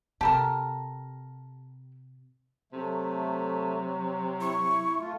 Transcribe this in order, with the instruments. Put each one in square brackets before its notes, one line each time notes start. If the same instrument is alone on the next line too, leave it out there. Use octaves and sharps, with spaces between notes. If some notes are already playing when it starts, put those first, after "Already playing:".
[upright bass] C3 [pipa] G4 A4 A#4 [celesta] A5 B5
[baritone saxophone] C3 [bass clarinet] F#3 [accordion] A3
[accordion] E4 [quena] C#6
[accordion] A3 F4